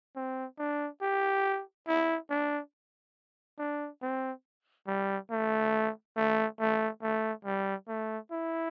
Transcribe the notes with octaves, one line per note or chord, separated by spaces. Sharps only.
C4
D4
G4
E4
D4
D4
C4
G3
A3
A3
A3
A3
G3
A3
E4